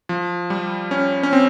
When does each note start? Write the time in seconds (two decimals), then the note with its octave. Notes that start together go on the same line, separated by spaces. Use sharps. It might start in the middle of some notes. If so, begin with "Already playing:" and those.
0.09 F3
0.50 G3
0.91 C#4
1.23 C#4
1.33 C4